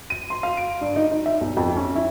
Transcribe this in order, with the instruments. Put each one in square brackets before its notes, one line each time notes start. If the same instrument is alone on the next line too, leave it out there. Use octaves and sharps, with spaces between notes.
[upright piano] D#7
C6
F5
D7
G2
D#4
D#4
E5
B1
F2
C#4
E4